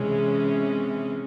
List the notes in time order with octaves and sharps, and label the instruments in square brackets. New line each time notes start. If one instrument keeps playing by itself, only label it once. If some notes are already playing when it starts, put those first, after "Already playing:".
Already playing: [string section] C3 E3 G#3 C#4